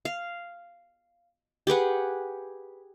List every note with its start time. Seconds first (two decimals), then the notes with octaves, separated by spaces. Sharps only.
0.05 F5
1.67 G4 G#4 B4 F#5